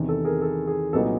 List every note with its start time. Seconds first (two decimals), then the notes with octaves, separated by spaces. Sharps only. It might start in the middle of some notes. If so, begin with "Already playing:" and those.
Already playing: E2 C3 D#3
0.09 A4
0.25 G#4 A#4
0.42 A4
0.67 G#4
0.93 C2 A#2 F#3 B3 D#4 A4